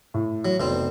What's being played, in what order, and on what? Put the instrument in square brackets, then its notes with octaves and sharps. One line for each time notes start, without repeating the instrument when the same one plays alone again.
[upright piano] A2
[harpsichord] F#3
[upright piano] F1 [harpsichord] B2 C4